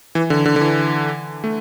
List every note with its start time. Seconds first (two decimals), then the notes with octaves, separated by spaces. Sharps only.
0.15 E3
0.30 D3
0.46 D3
0.56 D3
0.61 E3
1.44 A3